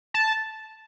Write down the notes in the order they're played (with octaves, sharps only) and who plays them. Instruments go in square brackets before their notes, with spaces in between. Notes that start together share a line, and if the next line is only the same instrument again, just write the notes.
[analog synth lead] A5